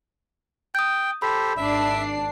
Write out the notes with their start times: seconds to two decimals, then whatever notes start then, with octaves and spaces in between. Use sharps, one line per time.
0.75 G5 D#6 G6
1.22 G4 A4 C5 B5
1.57 G#1 D4 E5 C7